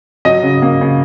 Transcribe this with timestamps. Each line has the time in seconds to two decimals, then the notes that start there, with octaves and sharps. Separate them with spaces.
0.25 F#3 D#5
0.43 C#3
0.62 A#3
0.81 C#3